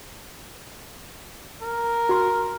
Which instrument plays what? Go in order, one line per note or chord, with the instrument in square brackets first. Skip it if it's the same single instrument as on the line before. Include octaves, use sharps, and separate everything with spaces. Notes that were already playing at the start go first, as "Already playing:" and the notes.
[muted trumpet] A#4
[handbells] F#4 C6